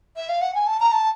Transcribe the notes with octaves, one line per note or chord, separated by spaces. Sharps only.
E5
F5
F#5
G#5
A5
A#5
A5